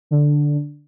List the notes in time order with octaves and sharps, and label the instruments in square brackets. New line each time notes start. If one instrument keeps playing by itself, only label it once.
[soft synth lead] D3